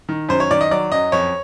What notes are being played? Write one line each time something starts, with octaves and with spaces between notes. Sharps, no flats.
D#3
F#2 C5
C#5
D#3 D5
D#5
F#3 D5
F#2 D#5
F2 C#5